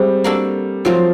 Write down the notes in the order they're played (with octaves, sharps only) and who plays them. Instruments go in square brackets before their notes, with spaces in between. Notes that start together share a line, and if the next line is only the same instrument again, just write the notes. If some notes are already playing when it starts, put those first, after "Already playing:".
Already playing: [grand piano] G3 [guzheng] G#3 C4 E4
[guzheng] A#3 D4 F#4 A4
[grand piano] F3 [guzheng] F#3 A3 C4 F4